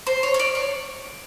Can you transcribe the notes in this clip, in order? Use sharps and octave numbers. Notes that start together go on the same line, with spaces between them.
C5
C#5
C#5
D5
C#5